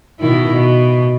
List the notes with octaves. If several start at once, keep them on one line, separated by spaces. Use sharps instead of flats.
B2 D#3 E4
B2